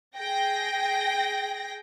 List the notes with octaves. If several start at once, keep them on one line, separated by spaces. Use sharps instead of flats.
G#4 G5 A#6